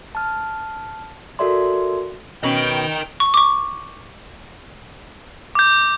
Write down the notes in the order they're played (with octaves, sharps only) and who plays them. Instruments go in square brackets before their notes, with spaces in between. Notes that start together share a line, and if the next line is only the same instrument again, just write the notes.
[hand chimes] A5 F6
F#4 A4 A#4 D5 E5 C6
[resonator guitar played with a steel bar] B2 C#4 B4 [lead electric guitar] A#4 D#5 [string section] G5
[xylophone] C#6
C#6 D6
[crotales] D6 G6